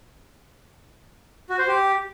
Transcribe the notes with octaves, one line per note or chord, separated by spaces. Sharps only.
F#4
C5
G4